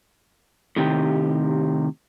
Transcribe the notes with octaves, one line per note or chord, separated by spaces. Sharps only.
A2 C3 D#3 G4